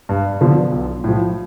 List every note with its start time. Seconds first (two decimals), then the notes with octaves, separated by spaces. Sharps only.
0.09 G2
0.41 D3 F3 B3
0.72 B1
1.04 A2 F3